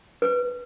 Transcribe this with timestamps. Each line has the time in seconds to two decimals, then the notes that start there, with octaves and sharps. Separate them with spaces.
0.22 B4